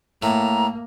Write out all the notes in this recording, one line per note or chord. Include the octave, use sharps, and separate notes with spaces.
A2 A#3 A#5